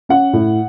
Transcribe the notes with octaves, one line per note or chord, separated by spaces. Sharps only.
C#4 F#5
A2